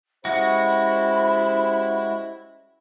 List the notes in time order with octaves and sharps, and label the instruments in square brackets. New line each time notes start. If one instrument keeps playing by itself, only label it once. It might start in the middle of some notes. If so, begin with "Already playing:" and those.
[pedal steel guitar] G#3 F#4 [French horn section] C#4 G4 C5 [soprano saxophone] E4 [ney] B5